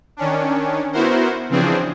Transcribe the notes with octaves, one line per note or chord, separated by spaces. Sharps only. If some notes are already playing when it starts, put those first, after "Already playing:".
D#3 C#4 D4
B3 E4 F#4 A#4 C5
C#3 E3 F3 C4 D4 G#4